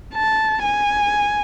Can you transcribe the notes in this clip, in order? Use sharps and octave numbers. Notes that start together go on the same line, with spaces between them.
A5
G#5